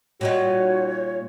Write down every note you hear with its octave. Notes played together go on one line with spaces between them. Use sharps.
A#2 G3 D#4 F#4 C#5